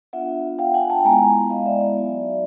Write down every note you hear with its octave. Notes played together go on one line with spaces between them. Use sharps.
B3 D4 F4 E5 F#5
F5 G5
F#5 G#5
G5 A5
G#3 B3 E4 G#5 A#5
D#5 F5
D5 E5
D5 E5
F#3 B3 D#4 F#4